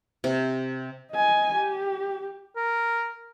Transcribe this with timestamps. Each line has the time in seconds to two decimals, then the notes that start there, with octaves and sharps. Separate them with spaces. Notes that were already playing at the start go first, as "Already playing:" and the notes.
0.24 C3
1.12 D#5 G#5
1.55 G4
2.56 A#4